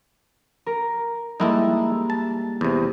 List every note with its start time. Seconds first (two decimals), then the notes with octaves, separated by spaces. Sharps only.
0.66 A#4
1.40 G3 G#3 A#3 D#4 E4 A4
2.10 A5
2.61 E2 C3